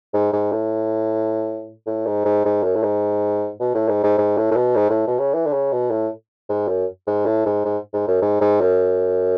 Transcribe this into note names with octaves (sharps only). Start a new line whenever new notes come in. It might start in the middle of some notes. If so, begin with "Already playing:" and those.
G#2
G#2
A2
A2
G#2
G#2
G#2
F#2
A2
G#2
B2
A2
G#2
G#2
G#2
A2
A2
B2
G#2
A2
B2
C#3
E3
D3
C#3
B2
A2
G#2
F#2
G#2
A2
G#2
G#2
G#2
F#2
G#2
G#2
F#2